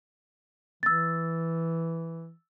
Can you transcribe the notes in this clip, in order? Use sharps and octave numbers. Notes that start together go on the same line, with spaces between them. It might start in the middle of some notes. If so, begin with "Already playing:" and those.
E3 E6 A6